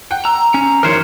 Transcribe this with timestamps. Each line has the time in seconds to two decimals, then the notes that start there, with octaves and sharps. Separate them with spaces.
0.11 F#5 G5
0.25 A#5 E6
0.54 C#4
0.83 F#2 D#3 E3 A#4 C5 C#5